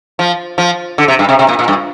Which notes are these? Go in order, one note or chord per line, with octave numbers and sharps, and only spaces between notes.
F3
F3
D3
C3
G2
C3
C3
A#2
A#2
G2